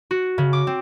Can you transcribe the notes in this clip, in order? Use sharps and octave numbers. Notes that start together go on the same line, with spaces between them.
F#4
C#3
D6
C4